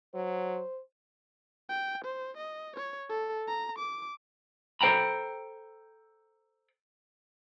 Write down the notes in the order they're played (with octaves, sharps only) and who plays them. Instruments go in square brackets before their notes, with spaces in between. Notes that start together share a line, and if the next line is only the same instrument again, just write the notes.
[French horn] F#3 [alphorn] C5
[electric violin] G5
C5
D#5
C#5
A4
A#5
D6
[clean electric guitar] A4 C5 G5 A#5 B5